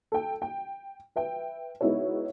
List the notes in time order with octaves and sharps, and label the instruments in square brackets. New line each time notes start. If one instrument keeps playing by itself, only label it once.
[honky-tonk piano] A4 G5
G5
B4 E5 G5
G#3 B3 D#4 E4 F#4 C#5